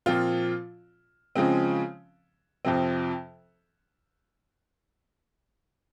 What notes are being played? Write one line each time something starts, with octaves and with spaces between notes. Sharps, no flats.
A#2 F3 C4 F4
C#3 F3 G#3 C4
F2 C3 F3 C4